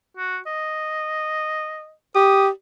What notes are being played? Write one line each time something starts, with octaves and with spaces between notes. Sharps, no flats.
F#4
D#5
G4 D#6